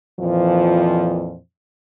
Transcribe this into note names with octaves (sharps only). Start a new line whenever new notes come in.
F2 A#2 E3 F3